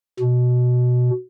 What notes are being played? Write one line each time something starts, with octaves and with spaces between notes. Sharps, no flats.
B2